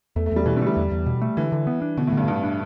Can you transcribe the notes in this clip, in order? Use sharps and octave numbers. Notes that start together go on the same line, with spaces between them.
E2 A3
A3
E2 G3
B2 E3
D3
G3 A3
E2
E2
B2
A3
D3 E3
D3
B3
D4
B2 D3
A2
G2 D3
G2 B3
D4